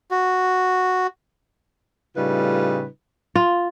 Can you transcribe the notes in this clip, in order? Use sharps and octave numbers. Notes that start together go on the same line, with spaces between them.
F#4
A2 C#3 G3 D#4 F4 B4
F4